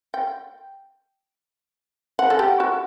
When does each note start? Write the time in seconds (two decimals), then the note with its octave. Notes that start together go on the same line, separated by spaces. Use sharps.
0.14 G5
2.19 F#5
2.30 A4
2.39 G4
2.60 F#4